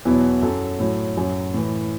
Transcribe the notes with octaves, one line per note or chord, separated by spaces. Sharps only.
E2 B2 F#3 E4
F#2 F#3 A4
A2 F#3
F#2 F#3
A2 E3